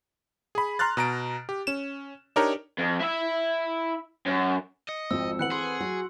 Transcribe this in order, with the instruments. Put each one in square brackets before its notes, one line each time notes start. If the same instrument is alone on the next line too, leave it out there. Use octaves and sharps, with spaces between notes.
[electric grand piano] G#4 B5
A#5 C6 F6 F#6 A6
B2 A#5 D7
G4
C#4 E7
D4 D#4 G4 A#4 C#5 A#5
[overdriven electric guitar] F2
E4 E5
F#2
[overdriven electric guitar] D#5 [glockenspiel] C#7
[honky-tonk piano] G#1 F2 F3 [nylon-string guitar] C4 A4 [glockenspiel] E6
[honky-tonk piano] E3 B4 F#5 [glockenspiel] F#6 C#7 F#7
[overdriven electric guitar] G#4 [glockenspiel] C6
[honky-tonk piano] F#3 [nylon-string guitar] F#4